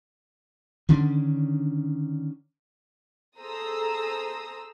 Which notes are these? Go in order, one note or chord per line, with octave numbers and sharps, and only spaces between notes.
D3 D#3 C#4 D4
G#4 A4 C5 A#5 D#6 E6